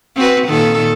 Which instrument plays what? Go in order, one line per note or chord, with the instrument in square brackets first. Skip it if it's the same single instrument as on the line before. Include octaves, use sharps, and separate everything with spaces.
[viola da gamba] C4 F#4 B4
A#2 D#3 A4